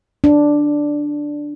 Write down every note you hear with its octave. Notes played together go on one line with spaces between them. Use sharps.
D4